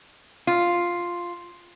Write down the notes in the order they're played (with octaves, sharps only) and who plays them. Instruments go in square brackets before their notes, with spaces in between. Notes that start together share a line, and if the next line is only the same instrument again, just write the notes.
[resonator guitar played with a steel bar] F4